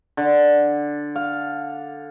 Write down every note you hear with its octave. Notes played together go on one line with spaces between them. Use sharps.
D3
F5